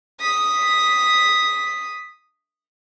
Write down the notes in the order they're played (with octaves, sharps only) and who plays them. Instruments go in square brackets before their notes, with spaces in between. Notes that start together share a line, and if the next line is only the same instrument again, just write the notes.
[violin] D#6 B6